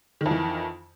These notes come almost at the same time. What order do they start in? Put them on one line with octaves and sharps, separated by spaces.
D#3 F2 E3